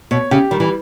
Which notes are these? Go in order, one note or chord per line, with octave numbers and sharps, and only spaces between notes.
B2 C#5
C#3 G4
D#3 G3
E3